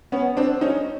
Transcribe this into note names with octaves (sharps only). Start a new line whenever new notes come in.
B3 C#4
C4 D4
C#4 D#4